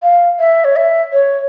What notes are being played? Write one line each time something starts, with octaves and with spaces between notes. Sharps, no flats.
F5
E5
C#5
E5
C#5